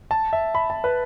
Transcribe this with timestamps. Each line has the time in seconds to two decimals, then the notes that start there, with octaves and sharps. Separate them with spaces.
0.11 A5
0.33 E5
0.55 B5
0.70 A5
0.84 B4